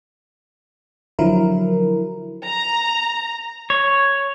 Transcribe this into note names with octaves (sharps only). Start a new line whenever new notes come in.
D3 F3 F#3 E4 A#4
A#5
C#5